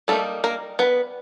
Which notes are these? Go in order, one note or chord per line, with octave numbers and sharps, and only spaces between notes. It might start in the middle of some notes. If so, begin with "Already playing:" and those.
G3 A3 A#3 D#4 A4
A#3 A#4
B3 B4